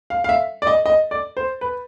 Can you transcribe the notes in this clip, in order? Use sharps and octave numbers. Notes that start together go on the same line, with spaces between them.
F5
F5
E5
D5
D#5
D#5
D5
C5
B4